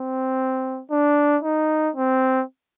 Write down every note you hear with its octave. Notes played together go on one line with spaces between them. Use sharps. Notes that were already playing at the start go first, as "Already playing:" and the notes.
Already playing: C4
D4
D#4
C4